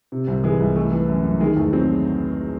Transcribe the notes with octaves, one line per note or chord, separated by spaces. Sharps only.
C3
C2 C4
E3 G#3
C2
E3 A3
E3
F#2
F#2
D#3 G#3
E2 A3
F#3 C4